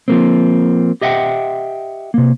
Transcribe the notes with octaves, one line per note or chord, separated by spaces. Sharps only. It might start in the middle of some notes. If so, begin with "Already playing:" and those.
F3 A#3 C4
G4 D#5 E5 F#5 G5
C3 A#3